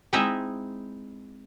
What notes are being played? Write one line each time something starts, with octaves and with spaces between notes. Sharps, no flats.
G#3 C4 D#4 E4 D#5 E5